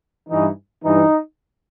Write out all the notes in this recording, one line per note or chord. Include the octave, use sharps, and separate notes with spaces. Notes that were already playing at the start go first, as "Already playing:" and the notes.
G2 E3 D#4
G2 E3 D#4